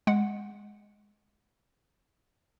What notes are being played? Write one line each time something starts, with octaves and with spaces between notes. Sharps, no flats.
G#3 F#5